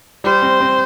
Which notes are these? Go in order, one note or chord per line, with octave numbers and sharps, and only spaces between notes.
G3 C5
C4
C4